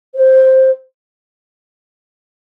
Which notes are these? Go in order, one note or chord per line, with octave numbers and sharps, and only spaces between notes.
C5